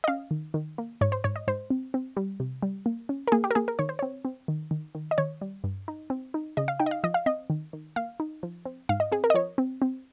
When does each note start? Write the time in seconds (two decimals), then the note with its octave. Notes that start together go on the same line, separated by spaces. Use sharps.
0.04 D#5
0.08 C#4 F5
0.31 D#3
0.54 D#3
0.78 A#3
1.01 G#2 C#5
1.12 C5
1.24 G#2 C#5
1.36 D#5
1.48 G#2 C5
1.70 C4
1.94 C4
2.17 G3
2.40 C3
2.63 G3
2.86 A#3
3.09 C#4
3.27 A#4
3.32 A#3 G#4
3.44 G4
3.51 A#4
3.55 A#3 G#4
3.68 A#4
3.79 D#3 C#5
3.89 C5
3.99 C4 C#5
4.25 C4
4.48 D#3
4.71 D#3
4.95 D#3
5.11 D#5
5.18 D#3 C#5
5.41 G3
5.64 G2
5.88 D#4
6.10 C4
6.34 D#4
6.57 C#3 D#5
6.68 F5
6.80 D#4 G5
6.86 D#5
6.91 F5
7.04 F3 D#5
7.14 F5
7.26 C4 D#5
7.50 D#3
7.73 D#3
7.96 A#3 F5
8.20 D#4
8.43 F3
8.65 C4
8.89 G#2 F5
9.00 D#5
9.12 C4 G#4
9.24 A#4
9.30 D#5
9.34 F3 C#5
9.58 C4
9.82 C4